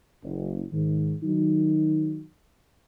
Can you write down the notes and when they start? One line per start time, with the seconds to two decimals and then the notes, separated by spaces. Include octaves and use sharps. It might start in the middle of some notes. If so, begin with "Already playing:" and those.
0.23 F#1
0.73 G#2 D#3
1.23 D#3 F#3 D#4